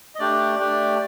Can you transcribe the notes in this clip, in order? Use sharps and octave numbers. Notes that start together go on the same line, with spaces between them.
D#5
A3 D4 G4 D5
A3 D4 G4